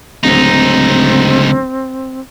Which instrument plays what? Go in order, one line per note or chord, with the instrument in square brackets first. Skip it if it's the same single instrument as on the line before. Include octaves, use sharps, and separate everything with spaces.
[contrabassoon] D1 [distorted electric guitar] C#2 D#4 [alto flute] C4